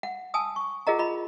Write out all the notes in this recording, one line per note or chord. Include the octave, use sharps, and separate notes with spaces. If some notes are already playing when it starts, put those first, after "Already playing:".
F#5
G#5 A5 D#6 E6
C#6
F4 G#4 A#4 D#5 F#5 A#5
F4 D#5 B5